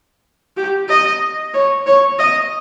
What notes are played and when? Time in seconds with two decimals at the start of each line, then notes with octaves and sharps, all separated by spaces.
0.57 G4
0.89 D#5
1.54 C#5
1.86 C#5
2.19 D#5